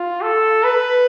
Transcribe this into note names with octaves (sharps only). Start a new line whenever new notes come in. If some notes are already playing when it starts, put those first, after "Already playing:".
Already playing: F4
A4
B4